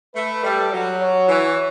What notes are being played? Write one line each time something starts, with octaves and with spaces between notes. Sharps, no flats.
A3 B4
G3 A4
F#3
C#5
E3 C#5